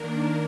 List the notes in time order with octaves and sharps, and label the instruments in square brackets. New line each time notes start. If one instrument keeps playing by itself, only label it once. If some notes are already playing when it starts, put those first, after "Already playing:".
Already playing: [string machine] D#3 A#3 D4 A#4